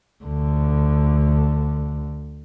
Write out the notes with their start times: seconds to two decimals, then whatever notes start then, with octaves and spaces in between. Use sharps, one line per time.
0.24 D2 D3